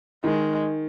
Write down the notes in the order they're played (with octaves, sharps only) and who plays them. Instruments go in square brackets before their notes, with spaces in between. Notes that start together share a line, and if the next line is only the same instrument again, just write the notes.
[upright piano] D#3 [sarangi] G#3